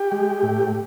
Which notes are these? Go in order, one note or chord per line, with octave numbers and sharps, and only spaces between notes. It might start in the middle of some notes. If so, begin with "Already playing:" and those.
Already playing: G4
G#3
A2